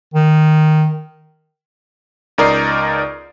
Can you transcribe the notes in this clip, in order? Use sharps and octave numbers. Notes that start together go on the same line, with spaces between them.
D#3
C#2 D#4 A#4 D5 D#6 C7